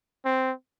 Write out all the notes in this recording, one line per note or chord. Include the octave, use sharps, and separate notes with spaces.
C4